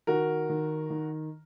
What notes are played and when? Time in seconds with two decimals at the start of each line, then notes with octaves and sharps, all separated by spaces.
0.07 D#3 F#4 A#4
0.50 D#3
0.90 D#3